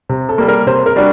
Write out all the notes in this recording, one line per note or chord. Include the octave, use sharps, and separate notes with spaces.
C3
A4
G3 A#3
A#4
C3 C5
A#4
G3 D4 F#4